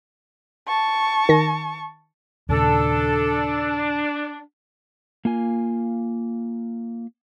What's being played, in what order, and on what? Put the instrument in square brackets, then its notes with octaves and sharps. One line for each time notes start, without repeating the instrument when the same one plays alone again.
[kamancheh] A5 C#6
[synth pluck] D#3 A#6
[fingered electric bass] D#2 A#2 C#3 [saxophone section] D4 [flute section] A4
[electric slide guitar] A#3 F4 G#5